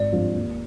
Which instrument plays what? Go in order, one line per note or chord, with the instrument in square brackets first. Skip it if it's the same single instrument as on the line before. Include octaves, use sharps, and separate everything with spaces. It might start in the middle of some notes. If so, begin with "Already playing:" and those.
Already playing: [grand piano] G#1 [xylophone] D5
[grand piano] G2 F3 C4 F4
D#2